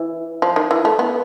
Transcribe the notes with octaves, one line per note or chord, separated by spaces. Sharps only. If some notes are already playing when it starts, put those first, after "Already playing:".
Already playing: E3
F3
D#3
E3
A3
B3